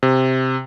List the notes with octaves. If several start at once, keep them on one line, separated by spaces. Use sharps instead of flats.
C3